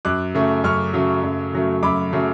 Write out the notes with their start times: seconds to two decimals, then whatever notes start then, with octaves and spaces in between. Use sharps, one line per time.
0.05 F#2 D6 F#6
0.34 C#3 F#3 A3
0.64 F#2 C#6 F6
0.94 C#3 F#3 A3
1.24 F#2
1.53 C#3 F#3 A3
1.83 F#2 B5 D6
2.12 C#3 F#3 A3